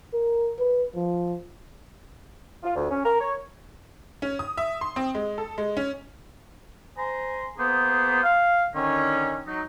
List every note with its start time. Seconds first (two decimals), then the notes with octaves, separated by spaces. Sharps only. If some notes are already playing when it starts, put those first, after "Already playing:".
0.13 A#4
0.59 B4
0.95 F3
2.64 F4
2.76 D2
2.91 C#4
3.04 A#4
3.20 C#5
4.22 C#4
4.39 D#6
4.57 E5
4.81 C6
4.96 C4
5.15 G#3
5.38 A4
5.58 G#3
5.77 C#4
6.98 C5 G#5 A#5 C6
7.58 A#3 B3 G#4 C5
8.23 F5
8.75 D3 D#3 C#4
9.47 F#3 D#4